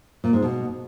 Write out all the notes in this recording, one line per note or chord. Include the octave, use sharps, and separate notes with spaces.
A#2
G#2
B2